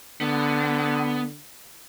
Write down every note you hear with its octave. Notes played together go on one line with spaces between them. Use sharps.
D3 B3